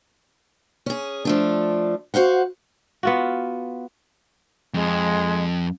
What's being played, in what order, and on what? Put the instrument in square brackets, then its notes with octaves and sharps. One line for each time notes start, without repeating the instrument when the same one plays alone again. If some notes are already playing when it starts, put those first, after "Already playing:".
[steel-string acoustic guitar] C#4 G#4
F3 A3 D4
F#4 C5 F5 F#5
[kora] B3 F4 F#4
[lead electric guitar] F2 [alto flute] G#3